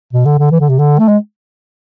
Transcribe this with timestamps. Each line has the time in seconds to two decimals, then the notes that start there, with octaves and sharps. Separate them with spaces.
0.13 B2
0.25 D3
0.39 D3
0.52 E3
0.61 D3
0.69 C3
0.79 D3
0.99 A3
1.08 G#3